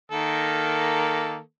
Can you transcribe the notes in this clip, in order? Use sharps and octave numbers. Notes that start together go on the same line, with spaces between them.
D#3 A#3 A4